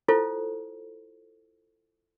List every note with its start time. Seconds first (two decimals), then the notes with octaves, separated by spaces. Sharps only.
0.08 E4 F4 A4 C5